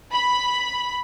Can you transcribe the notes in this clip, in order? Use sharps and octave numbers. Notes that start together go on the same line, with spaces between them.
B5